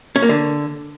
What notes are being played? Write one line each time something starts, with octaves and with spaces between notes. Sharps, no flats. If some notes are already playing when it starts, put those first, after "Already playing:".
C#4
A#3
D3